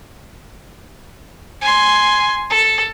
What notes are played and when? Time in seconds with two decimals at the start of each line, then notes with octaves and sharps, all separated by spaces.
1.61 G#5 C6
2.50 A4